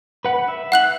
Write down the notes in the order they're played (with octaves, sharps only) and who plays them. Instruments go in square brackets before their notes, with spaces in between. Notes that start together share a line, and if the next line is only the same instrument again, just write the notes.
[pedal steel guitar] B4 F#5 B5
E5
[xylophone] F#5 F#6 F#7